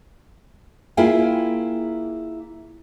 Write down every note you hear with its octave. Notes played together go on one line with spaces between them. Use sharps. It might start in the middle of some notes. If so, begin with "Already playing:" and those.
A#3 E4 F4 G#4 G5